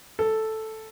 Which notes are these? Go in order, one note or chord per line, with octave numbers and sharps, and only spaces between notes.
A4